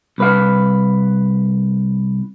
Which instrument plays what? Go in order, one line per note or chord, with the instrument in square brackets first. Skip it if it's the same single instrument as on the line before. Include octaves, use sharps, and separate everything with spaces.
[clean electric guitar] C2 B4 F5